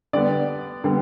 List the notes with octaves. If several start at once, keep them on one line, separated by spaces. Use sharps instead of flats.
D3 G3 B3 D5
D3 G3 B3